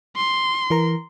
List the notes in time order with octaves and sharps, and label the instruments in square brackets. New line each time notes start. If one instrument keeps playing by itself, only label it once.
[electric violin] C6
[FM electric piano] E3 A#4 A#5